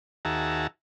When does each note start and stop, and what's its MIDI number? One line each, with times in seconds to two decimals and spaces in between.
0.25 0.67 39
0.25 0.67 66
0.25 0.67 68
0.25 0.67 76
0.25 0.67 81
0.25 0.67 82